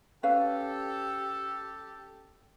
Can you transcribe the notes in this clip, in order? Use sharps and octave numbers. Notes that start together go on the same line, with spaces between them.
C#4 G4 A4 B4 F5